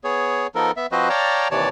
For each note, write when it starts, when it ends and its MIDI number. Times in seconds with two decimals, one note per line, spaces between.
0.04 0.47 59
0.04 0.47 68
0.04 0.47 73
0.55 0.71 53
0.55 0.71 59
0.55 0.71 63
0.55 0.71 69
0.55 0.71 70
0.77 0.87 59
0.77 0.87 76
0.92 1.09 53
0.92 1.09 60
0.92 1.09 66
0.92 1.09 71
0.92 1.09 72
0.92 1.09 75
1.09 1.48 73
1.09 1.48 74
1.09 1.48 77
1.09 1.48 79
1.09 1.48 81
1.09 1.48 82
1.51 1.69 39
1.51 1.69 48
1.51 1.69 52
1.51 1.69 73
1.51 1.69 74
1.51 1.69 81